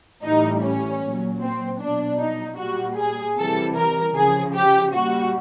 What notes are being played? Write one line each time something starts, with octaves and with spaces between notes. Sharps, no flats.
A2 E3 G3 D#4
C#4
A#2 F#3
C4
B2 F#3 D4
D#4
A#2 G3 F#4
G#4
C3 E3 G3 A4
A#4
C#3 F3 G#4
G4
A#2 G3 F#4